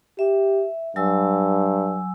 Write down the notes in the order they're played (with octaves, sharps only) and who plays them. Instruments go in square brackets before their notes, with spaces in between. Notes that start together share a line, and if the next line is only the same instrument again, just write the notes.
[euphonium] G4 [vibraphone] E5
[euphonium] G2 [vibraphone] F#3 G#5 E6